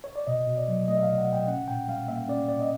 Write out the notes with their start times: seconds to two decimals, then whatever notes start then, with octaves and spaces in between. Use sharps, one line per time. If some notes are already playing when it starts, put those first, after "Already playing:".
0.04 C#5
0.16 D5
0.27 B2 D#5
0.47 B2
0.57 D5
0.68 F#3
0.88 A3 D#5
0.97 E5
1.03 B2 F5
1.18 F#5
1.28 B2
1.33 G5
1.48 C#4 F#5
1.68 A#2 G5
1.88 G3 F5
2.08 A#3 E5
2.28 C#4 D5
2.48 A#2 D5
2.60 D#5